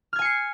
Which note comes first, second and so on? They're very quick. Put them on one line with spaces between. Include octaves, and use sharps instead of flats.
F6 G#6 G#5 C#7 C7